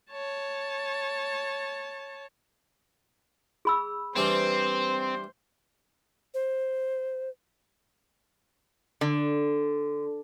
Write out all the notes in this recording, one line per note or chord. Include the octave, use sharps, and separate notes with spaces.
C#5 A5
G#4 B5 E6
E3 G3 C4 D4 C5
C5
D3